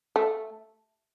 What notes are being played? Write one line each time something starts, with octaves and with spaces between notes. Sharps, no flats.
A3